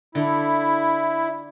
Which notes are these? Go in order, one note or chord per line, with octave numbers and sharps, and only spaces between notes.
D3 E4 A4